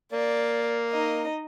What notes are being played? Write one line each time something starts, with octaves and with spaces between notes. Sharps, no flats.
A#3 D5
D#4 D#5